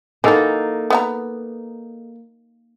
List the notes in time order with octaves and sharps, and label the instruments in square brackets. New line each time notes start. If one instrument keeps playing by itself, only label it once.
[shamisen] E3 F#3 [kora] A#3 D#4 A4
[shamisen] B3 E5 A#5